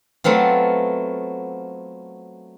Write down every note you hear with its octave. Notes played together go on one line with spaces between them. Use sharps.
F#3 A3 B3 C4 F4